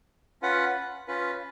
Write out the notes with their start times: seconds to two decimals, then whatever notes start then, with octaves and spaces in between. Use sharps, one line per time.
0.42 C#4 F4 B4 F#5
1.08 C#4 F4 B4